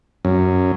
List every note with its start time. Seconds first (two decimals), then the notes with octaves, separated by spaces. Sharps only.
0.25 F#2